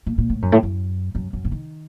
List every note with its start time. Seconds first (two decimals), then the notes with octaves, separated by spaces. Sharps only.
0.06 A#2
0.18 A#2
0.30 A2
0.42 F#2
0.52 A2
0.63 F#2
1.15 F#2
1.33 F#2
1.45 C#3
1.52 D#3